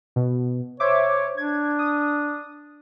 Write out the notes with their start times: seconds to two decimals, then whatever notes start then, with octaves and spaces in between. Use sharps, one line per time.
0.16 B2
0.80 C5 C#5 E5 D6
1.37 D4 G#6
1.79 D#6